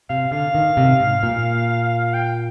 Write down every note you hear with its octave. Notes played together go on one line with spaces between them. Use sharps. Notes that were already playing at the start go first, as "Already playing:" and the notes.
C3 F5
D3 F5
D#3
C3
G#2
A#2
G5